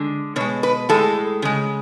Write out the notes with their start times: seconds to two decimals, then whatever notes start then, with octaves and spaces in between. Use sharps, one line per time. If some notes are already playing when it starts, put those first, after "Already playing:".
Already playing: D3 G#3
0.36 B2 C#5
0.41 G#3
0.63 B4
0.89 A2 G#3 A4
1.42 C#3 G#3